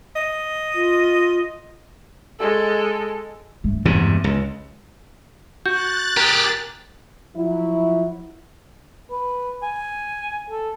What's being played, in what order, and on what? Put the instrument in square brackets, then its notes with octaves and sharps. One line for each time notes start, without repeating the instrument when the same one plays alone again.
[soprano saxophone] D#5
[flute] F4
[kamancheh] G#3 A4
[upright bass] G2 A3
[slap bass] E2 G#2 C3
C#2
[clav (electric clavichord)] F#4 [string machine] F#6 A6 [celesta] G6
[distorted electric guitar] G4 G#4 [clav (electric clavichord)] A#4
[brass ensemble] F3 F#3 E4
[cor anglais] B4
G#5
A4